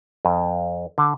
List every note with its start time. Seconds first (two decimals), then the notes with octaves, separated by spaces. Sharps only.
0.25 F2
0.98 D3